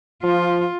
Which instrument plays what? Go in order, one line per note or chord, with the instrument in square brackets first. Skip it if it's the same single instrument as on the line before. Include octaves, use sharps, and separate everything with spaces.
[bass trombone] F3 [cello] F4